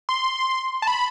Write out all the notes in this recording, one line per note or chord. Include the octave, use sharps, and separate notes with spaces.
C6
A5
B5